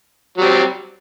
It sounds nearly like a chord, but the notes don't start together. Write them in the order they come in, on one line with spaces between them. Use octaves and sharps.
F#3 G3 C4